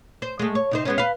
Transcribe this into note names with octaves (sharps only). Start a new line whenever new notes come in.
C5
G#3 A3
C#5
C3 D#4 C5
G#3 B3 C#4
B4 F5